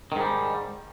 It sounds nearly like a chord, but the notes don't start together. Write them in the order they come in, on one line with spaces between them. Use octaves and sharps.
D#3 G#2 G3